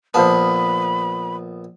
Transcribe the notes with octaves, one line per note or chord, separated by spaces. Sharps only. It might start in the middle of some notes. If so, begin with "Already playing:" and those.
A#1 B3 C5 F5 A5 B5